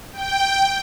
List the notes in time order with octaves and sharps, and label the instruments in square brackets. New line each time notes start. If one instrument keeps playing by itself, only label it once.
[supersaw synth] G5